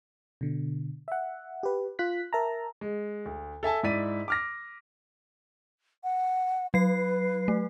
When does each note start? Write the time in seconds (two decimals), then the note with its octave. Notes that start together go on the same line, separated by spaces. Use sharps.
0.41 B2 D3
1.08 E5 F#5
1.63 G4 B4
1.99 F4 F#6 B6
2.33 A#4 E5 A5 A#5
2.81 G#3
3.25 D2
3.63 A4 E5 G#5 A5
3.83 G#2 E4 D5 B6 D#7
4.28 D6 F6 A#6
6.04 F#5
6.74 F#3 B4 C7
7.48 A3